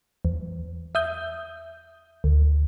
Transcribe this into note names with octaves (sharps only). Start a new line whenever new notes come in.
E2
E5 D#6 G6
D2